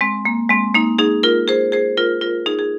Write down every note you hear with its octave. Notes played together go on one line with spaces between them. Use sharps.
G#3 C4
A#3
G#3 C4
A#3 D#4
D#4 G#4
F4 A#4
G#4 C5
G#4 C5
F4 A#4
F4 A#4
D#4 G#4
G#4